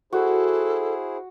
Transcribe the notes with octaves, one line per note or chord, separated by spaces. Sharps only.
E4 F#4 G#4 A4 C5